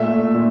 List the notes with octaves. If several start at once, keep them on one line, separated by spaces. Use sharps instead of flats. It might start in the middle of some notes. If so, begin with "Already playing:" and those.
Already playing: A#2 A3 E5
A#2